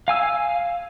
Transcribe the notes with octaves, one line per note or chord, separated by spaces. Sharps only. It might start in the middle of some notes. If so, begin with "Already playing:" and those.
F5 G#5 E6